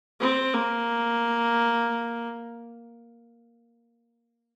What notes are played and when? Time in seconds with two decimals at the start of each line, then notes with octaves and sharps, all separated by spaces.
0.21 C4
0.54 A#3